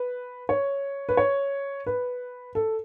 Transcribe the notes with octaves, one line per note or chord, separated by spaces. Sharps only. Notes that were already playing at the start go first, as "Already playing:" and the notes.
Already playing: B4
C#5
B4
C#5
B4
A4